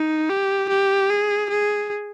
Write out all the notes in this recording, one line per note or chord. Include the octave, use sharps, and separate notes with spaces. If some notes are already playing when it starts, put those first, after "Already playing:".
Already playing: D#4
G4
G4
G#4
G#4